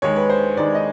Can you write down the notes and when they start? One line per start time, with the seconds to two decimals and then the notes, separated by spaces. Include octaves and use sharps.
0.02 D#2 D#3 G#3 C#5
0.16 B4
0.30 C5
0.57 D#2 D#3 G#3 D5
0.75 D#5